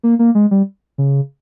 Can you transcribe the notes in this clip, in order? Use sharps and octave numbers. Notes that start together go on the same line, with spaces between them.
A#3
A#3
G#3
G3
C#3